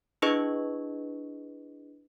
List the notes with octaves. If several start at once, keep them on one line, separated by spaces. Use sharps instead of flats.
D4 E4 G#4 B4 D#5 C#6